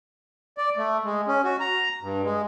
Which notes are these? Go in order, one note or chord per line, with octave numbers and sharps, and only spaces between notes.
D5
A3
G#3
C#4
F#4
A#5
G2
G#3